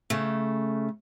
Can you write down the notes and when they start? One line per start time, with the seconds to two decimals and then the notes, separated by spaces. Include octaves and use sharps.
0.10 C#3 A3